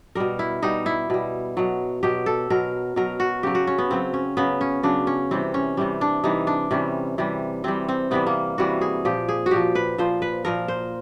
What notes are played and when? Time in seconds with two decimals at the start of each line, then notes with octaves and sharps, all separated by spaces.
0.15 B2 G3 A#4
0.39 E4
0.63 B2 G3 D#4
0.86 E4
1.10 B2 G3
1.57 B2 F#3
2.03 B2 F#3 G4
2.26 A4
2.50 B2 F#3 A#4
2.96 B2 F#3 A#4
3.20 F#4
3.43 C#3 F#3 G4
3.55 F#4
3.67 C#4
3.78 B3
3.91 C#3 F#3 C4
4.14 C#4
4.37 C#3 F#3 B3
4.61 C#4
4.83 C#3 F#3 D4
5.07 C#4
5.31 C3 E3 G3 C4
5.54 C#4
5.77 C3 E3 G3
6.01 D4
6.23 C3 E3 G3 D#4
6.47 D4
6.71 C3 E3 G3 C#4
7.18 C3 E3 G3
7.64 C3 E3 G3 C4
7.89 C4
8.11 C3 E3 G3 B3
8.27 A#3
8.58 C3 E3 G3 F#4
8.81 G#4
9.05 A#2 F3 G4
9.29 G#4
9.46 F#4
9.51 A#2 F3 G4
9.75 B4
9.98 A#2 F3 C5
10.22 B4
10.45 A#2 F3 A#4
10.68 C5